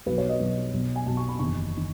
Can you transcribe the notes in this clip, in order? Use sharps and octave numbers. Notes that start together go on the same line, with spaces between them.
B1 B2 F#3 B4
C#5
D#5
B1 B2 F#3
B1 B2 F#3
G#5
B1 B2 F#3 A5
C#6
B5
F#1 E2 D#3 C#6
D#3